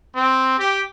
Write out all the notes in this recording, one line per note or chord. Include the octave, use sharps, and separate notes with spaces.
C4
G4